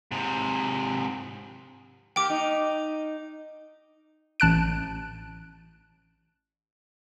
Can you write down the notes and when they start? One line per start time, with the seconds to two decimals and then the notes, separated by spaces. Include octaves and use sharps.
0.11 G#2 C3
2.16 A#3 G4 G5 D6
2.30 D#4
4.40 A1 A5 F#6 D7